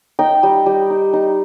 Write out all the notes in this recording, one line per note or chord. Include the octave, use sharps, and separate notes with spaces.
D#4 G5
G3
G3
D#4
D#4